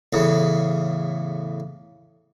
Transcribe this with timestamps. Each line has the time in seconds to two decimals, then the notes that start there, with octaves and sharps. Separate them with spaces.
0.13 E2 A2 C#3